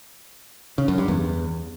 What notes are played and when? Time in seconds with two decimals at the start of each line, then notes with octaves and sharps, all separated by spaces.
0.78 C#3
0.88 F#2
0.98 G2
1.08 E2